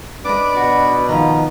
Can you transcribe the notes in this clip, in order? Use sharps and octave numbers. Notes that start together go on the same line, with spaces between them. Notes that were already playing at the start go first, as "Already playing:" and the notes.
D4 B4 D5 D#5 D6
B2 F#4
D#3 F3 A#5